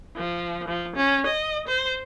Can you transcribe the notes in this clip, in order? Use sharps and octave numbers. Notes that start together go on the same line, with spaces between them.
F3
F3
C#4
D#5
C5